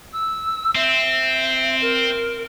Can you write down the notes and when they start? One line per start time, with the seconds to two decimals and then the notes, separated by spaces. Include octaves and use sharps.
0.13 E6
0.75 C4 E5
1.81 A#4